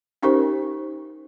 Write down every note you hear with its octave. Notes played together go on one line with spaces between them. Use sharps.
C#4 D#4 G4 A#4 C5